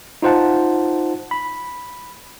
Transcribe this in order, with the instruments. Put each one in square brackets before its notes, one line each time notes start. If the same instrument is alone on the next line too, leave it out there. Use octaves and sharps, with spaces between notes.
[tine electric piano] D#4 F4 C5 F#5 A5
B5